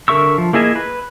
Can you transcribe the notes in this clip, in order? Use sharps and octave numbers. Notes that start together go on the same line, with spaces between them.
D3 A#4 E5 C#6 E6
F3
A#3 E4 G#4 D#5 E5
B4